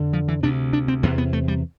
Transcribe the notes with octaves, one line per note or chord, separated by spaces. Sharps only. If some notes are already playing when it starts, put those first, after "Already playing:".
Already playing: F2 D3
F3
E3
D2 C3 D4
D4
C4
E2 C3 B3
B3
A3
G3